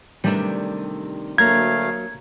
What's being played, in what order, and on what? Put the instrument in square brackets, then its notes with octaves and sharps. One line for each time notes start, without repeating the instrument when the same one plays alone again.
[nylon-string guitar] C3 D#3 [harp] G3 A3 D4
[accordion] D2 A3 F5 [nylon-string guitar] F#3 A#3 [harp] A#5 [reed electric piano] G#6